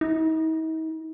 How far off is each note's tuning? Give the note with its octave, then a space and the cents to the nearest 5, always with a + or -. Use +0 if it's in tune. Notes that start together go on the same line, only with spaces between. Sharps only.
D#4 +45